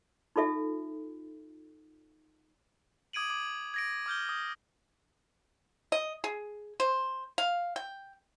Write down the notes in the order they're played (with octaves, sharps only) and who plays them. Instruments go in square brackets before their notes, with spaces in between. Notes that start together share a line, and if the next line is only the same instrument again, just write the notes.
[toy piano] D#4 F4 A4 E5
[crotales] D6 D#6 G#6 D7 D#7 F#7
D6
G#6 A#6 D7
D6 F6 G6 G7
D#6
[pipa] D#5
G#4
C5
F5
G5